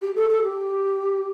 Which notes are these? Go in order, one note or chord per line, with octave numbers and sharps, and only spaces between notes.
G4
A4
A4
G4